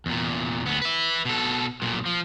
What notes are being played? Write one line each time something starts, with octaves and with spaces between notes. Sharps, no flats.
E2 A#2
D2 B3
B4 E5
B2 A4
B1 A#2
F3